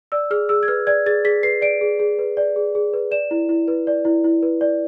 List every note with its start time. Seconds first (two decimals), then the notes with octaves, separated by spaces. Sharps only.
0.12 D5 E6
0.31 G#4 F6
0.49 G#4 E6
0.63 G#6
0.68 B4 F6
0.87 D5 G#6
1.06 G#4 A6
1.24 G#4 B6
1.43 B4 C7
1.62 D5 D7
1.81 G#4
2.00 G#4
2.19 B4
2.37 D5
2.56 G#4
2.75 G#4
2.93 B4
3.11 D5 E7
3.31 E4
3.49 E4
3.68 B4
3.87 D5
4.05 E4
4.24 E4
4.43 B4
4.61 D5